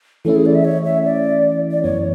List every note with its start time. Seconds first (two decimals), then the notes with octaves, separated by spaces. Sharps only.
0.25 E3 A3 C#4 E4 A4
0.35 G#4
0.46 D5
0.55 E5
0.65 C#5
0.85 E5
1.05 D5
1.71 D5
1.83 F#2 E3 B3 C#5